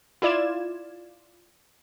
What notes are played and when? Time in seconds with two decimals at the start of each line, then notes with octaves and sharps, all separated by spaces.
0.22 E4 F4 D5 G#6 E7